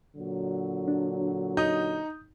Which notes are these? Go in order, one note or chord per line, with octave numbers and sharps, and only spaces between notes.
A#2 D3 F#3
D4
D#4 D#6 G6